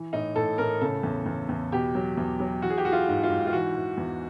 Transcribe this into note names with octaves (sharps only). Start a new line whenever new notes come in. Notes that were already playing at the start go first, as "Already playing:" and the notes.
Already playing: E3
A2 D#4
A2 A4
A2 A#4
C#3 A4
E2
E2
E2
B2 G4
F#3
E2
F#3
E3 F#4
G#4
G4
E3 F#4
F4
G#2
F4
G#2
F4
E3 F#4
E3
E2